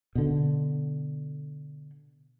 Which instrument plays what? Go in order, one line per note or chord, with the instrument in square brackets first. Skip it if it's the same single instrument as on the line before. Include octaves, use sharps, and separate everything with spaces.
[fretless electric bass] B2 D3